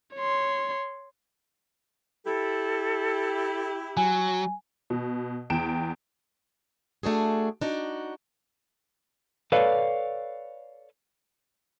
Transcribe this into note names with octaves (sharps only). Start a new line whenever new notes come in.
C#5 C6
E4 G4 A4
F#3 G#5
B2
E2 G5 D7 E7
A3 D4 F#4 G#4
D4 D#4 F#4
A4 B4 C#5 D5 F5